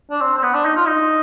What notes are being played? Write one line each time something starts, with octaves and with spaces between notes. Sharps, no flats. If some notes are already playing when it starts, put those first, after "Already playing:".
D4
C4
C4
B3
D4
D#4
F4
D#4